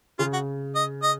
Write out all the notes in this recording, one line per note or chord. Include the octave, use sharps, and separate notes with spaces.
C#3 F4
F#4
D#5
D#5